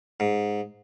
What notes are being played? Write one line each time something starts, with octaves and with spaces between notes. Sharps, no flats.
G#2